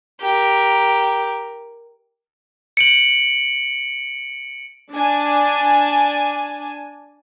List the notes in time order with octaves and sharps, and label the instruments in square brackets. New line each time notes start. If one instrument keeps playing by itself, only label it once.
[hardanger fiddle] G4 A#4
[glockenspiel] C#7 D7 F#7
[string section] D4 G#5 A5